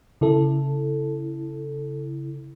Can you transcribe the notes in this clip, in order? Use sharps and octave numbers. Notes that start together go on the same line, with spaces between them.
C#3 E4 A4